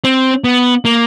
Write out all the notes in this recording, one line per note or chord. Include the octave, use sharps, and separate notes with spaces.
C4
B3
A#3